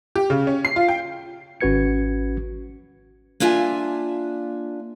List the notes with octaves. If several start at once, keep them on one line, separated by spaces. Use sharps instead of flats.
G4
C#3
C#4
C7
F4
G5
G#1 C#4 F#4 B4 G#6 C#7
A#3 D4 F4 E5 G#5